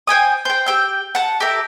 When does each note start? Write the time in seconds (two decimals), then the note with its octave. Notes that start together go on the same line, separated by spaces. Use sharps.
0.07 C5 G5 G#5 D#6
0.45 C5 G5
0.66 G4 G5 E6
1.15 F#5 A5
1.40 G4 A4 A#4 E5